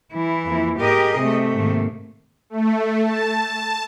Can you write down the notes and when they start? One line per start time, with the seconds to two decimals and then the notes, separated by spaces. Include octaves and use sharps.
0.14 E3 E4
0.46 F2 A#3
0.78 G#2 G4 G#4 A#4 D#5
1.18 C3 A3
1.54 G#2 D#3 A#3
2.50 A3
3.03 A5